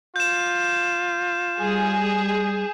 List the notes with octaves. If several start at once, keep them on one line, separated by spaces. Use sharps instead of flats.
F4 G6 E7
G3 G#4